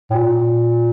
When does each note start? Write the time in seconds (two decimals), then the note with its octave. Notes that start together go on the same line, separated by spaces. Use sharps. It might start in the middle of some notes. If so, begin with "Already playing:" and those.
0.10 A2
0.15 A#2